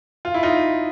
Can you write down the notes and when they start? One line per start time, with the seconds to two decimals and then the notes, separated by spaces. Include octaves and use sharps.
0.25 F4
0.34 E4
0.43 D#4 F4